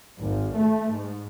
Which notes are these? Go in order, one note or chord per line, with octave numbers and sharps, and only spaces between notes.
G#1
A3
G#2